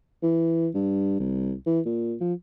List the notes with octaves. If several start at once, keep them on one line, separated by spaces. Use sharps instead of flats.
E3
G2
C2
E3
A#2
F3